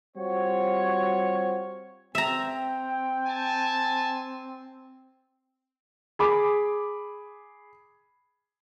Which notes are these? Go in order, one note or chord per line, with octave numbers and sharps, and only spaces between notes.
G3 C4 F4 F#4 C#5
C4 E5 G5 A#5
G#5 A5
G#4 B5 D6